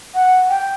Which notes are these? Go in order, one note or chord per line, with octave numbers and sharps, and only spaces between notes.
F#5
G5